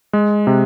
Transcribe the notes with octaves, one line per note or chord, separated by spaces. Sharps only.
G#3
C3